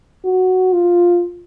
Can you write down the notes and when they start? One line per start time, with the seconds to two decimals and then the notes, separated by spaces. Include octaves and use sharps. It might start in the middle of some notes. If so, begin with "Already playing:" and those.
0.25 F#4
0.73 F4